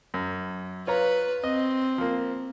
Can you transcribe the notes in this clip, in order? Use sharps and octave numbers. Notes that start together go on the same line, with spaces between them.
F#2
F4 B4 C#5 A#5
C4 D#5
F3 A#3